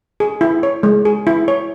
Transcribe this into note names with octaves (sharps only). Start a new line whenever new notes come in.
G#4
E4
C#5
G#3
G#4
E4
C#5